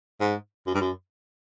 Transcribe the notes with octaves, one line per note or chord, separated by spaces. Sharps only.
G#2
F#2
G2
F#2